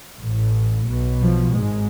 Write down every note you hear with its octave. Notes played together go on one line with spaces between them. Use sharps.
A1 A2
B1 B2
F3
G#1 G#2 G#3